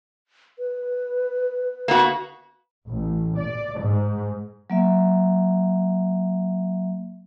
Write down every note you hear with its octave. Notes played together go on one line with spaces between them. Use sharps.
B4
A#3 B3 F#4
A1
D5
G#2
F#3 A#3 E5